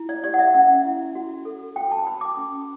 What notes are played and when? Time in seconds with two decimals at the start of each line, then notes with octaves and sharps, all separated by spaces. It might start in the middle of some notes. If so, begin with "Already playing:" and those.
Already playing: E4
0.09 D5
0.24 G4 D5
0.34 F#5
0.39 E5
0.54 C#4 F#5
0.85 E4
1.15 F#4
1.45 A4
1.76 F#4 G5
1.92 A5
2.07 B4 B5
2.21 D6
2.37 C#4